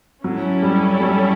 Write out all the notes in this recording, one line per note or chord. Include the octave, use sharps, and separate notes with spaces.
F#3 C#4 E4 A4
G3
G3